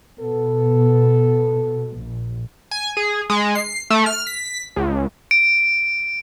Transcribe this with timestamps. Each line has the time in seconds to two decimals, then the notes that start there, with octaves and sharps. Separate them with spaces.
0.19 B2 B3 A4
1.97 A#1
2.71 G#5
2.97 G#4
3.30 G#3
3.55 C7
3.90 A3
4.06 F6
4.27 B6
4.76 C#2
5.31 D7